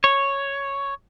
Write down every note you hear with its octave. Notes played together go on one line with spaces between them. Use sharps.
C#5